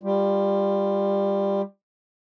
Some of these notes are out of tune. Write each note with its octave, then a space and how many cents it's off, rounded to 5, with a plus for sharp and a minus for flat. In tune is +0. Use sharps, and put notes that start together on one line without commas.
G3 +15 F4 +0